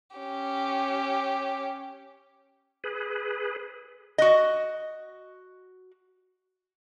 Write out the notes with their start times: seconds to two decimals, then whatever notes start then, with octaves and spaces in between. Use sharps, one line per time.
0.17 C#4 G4
2.84 G#4 B4
4.18 F#4 D#5